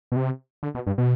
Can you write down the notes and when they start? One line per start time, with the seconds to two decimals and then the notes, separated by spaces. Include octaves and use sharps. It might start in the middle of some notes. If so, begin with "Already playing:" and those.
0.12 B2
0.16 C3
0.63 D3
0.75 B2
0.87 G2
0.98 B2